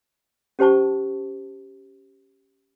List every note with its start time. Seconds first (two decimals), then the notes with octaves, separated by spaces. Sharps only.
0.59 C#4 G4 C5 A5 C#6